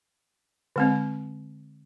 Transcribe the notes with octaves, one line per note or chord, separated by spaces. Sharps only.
D3 G#3 C4